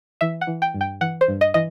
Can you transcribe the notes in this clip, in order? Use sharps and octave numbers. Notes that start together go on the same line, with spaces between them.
E3 E5
F#5
E3
G5
G2
G5
E3 F#5
C5
G2
D#5
E3 D#5